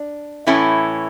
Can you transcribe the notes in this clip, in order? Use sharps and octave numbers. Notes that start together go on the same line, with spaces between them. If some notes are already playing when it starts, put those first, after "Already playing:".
Already playing: D4
A2 E3 A3 C#4 E4